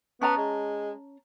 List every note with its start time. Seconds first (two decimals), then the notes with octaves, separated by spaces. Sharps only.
0.21 B3 C#4 A5 A#5
0.37 G#3